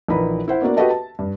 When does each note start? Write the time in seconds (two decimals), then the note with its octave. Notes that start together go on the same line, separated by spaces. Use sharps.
0.08 A#1 E3 D#4 A#4 B4 B5
0.48 E4 C5 F#5
0.62 A#3 B3 D4 F#4 A#4 D5
0.77 F#4 G4 A4 B4 D#5 A5
0.90 A5
1.19 G2